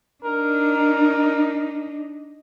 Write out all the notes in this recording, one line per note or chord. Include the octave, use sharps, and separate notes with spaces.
D4 D#4 A#4